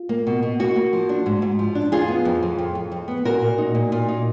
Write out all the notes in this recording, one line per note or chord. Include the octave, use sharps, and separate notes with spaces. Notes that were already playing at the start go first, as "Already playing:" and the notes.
Already playing: F4
A#3
B2
B2
A#3 F#4
A#3
F3
D4
G#2
G#2
F3
D4
F2 F4 G#4
B3
F2
F2
F2
F2
F2
B3
A#2 F#4 A#4
A#2
D#4
A#2
A#2
D#4